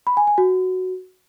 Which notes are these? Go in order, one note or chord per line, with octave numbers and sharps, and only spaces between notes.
B5
G#5
G#5
F#4